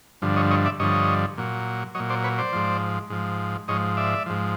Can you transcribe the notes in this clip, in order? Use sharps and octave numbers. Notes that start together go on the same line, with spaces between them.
G2 D3 F3
C#5 D#5
C#5 D#5
D5 E5
G2 D3 F3 C#5 D#5
A#2 F#3
A#2 F#3 C#5 D#5
C5 D5
B4 C#5
C5 D5
G#2 F3
G#2 F3
G#2 F3 C#5 D#5
D5 E5
G#2 F3